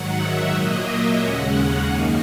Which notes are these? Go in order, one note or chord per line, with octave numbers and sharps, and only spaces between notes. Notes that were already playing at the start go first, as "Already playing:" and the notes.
Already playing: G#2 D#3 F#3 F#5
E5
A#2 F#3 A#3 D#5
E5
D#2 C#3 G#3 C#4 F#5
F#2 D#3 A#3 D#4